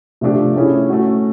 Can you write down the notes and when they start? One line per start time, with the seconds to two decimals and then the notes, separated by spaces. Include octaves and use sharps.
0.21 C3 F3 A3 D4 G4
0.55 A3 C#4 E4 G#4
0.89 A3 C#4 F#4